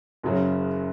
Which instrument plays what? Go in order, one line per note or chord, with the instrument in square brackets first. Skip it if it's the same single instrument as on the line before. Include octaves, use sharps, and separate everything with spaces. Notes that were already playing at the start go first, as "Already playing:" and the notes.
[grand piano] F#1 F#2 C#3 F#3